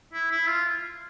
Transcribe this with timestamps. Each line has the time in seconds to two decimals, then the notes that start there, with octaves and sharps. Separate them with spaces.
0.13 E4
0.31 E4
0.48 F4